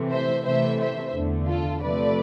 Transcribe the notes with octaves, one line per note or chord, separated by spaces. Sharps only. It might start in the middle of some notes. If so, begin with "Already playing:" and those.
Already playing: C3 E3 A3
C5 E5
C3 E3 A3 C5 E5
C5 E5
E2 D3 A3
F4 A4
C3 F3 A3 B4 D5